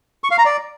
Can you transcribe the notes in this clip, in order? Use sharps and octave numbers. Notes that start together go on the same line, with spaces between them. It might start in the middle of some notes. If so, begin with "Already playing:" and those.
C#6
F5
A#5
D5